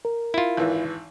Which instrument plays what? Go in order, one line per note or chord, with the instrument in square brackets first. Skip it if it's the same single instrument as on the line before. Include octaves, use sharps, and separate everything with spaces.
[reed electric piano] A#4
[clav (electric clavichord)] E4 F4
[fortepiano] G#1 E3